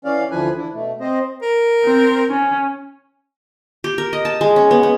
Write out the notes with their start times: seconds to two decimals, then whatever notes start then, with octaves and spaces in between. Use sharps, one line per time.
0.05 E3 C#4 D5 F5
0.31 D2 E3 F3 B4 G#5
0.57 D4 E4
0.74 B2 A3
1.01 C4 C5 D#5
1.42 A#4
1.84 C4
2.30 C#4
3.84 G4
3.98 A#4
4.13 D#5
4.25 A5
4.41 G#3
4.56 C#4
4.71 B3
4.83 B3